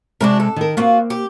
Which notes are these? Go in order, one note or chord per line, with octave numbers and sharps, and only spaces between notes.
C3 G#3 D4 F#4 A#4
A4
D#3 A#4
A#3 C4 F4 F#4
G4